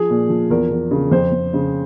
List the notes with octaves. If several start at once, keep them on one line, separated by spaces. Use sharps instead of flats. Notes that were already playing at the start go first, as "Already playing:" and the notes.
Already playing: F3 G#4
A#2
F3
E2 A#4
E2
C#3
F2 C5
F2
C#3